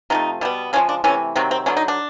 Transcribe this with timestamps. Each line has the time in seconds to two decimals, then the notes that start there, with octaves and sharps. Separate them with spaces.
0.10 C3 F3 A3 D#4
0.41 B2 G3 B3
0.73 C#3 F3 G#3 C#4
0.89 D4
1.04 C3 E3 A3 C#4
1.36 C3 D#3 F#3 C4
1.51 C4
1.66 D3 F#3 B3 C#4
1.77 D#4
1.88 D4